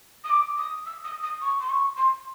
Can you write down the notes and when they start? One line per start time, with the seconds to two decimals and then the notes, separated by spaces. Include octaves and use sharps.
0.24 D#6
0.30 D6
0.57 D#6
0.86 E6
1.04 D#6
1.23 D#6
1.41 C#6
1.60 C6
1.69 C#6
1.97 C6